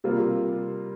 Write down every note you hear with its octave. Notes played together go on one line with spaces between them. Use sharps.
C3 G3 A#3 F4